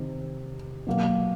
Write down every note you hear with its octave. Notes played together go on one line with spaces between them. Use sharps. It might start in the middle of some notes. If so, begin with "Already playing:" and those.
Already playing: C3 D#3
B2 F#3 A#3